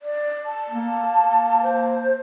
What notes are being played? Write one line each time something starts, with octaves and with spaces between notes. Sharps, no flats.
D5
A5
A#3
C5